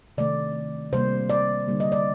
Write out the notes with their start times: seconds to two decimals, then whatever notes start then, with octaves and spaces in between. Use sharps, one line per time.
0.18 C3 D#3 A3 D5
0.93 C3 G3 A#3 C5
1.30 D5
1.68 D3 G3 A#3
1.80 D#5
1.92 D5